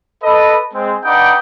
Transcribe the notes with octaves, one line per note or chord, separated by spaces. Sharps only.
A4 B4 D#5
G#3 C4
D4 D#4 B4 D5 F#5 G5